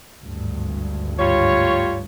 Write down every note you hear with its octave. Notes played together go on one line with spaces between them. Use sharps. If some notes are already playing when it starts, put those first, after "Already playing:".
G#1 D2 G2
G3 F4 C#5